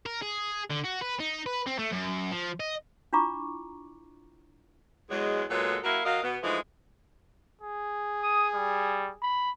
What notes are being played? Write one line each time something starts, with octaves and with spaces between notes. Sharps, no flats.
A#4
G#4
D3
F#4
B4
D#4
B4
C4
A3
F#2
F3
D#5
D4 E4 F4 A#5 C#6 D6
E2 F#3 G#3
A#2 F#3 G#3 B3 A4
F#3 A#3 E4 A#4 F5
F#3 A#4 D#5 F5
B2 B3
E3 F3 G#3 A3 D#4
G#4
D#6
G3
B5